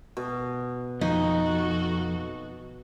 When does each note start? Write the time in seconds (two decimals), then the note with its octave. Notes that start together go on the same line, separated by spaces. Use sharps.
0.17 B2
1.01 F2 D#4 F#4 A4